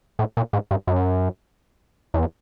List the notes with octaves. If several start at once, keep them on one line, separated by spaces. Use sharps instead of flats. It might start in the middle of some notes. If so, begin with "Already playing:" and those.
A2
A#2
G#2
G2
F#2
E2